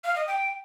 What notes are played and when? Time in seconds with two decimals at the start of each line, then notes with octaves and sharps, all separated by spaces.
0.04 F5
0.15 D#5
0.27 G5